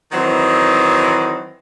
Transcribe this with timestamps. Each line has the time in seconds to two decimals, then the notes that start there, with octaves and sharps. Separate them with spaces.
0.12 D#3 E3 F#3 C4 D#4